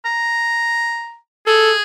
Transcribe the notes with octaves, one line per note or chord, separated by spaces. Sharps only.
A#5
G#4 A4